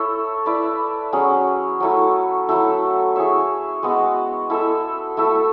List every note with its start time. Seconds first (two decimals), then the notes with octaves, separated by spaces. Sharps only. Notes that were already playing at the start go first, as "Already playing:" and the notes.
Already playing: E4 A4 C#5 E5
0.46 E4 B4 D5
1.13 F#3 C#4 G#4
1.80 F#3 A3 E4
2.49 F#3 A3 E4 A4
3.16 E4 G#4 C#5 E5
3.83 G#3 B3 F#4
4.50 E4 A4 E5
5.17 A3 E4 A4 E5